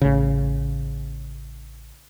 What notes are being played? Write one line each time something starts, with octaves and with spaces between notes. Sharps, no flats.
A1 C#3